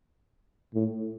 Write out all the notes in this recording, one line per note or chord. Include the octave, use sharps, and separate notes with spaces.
A2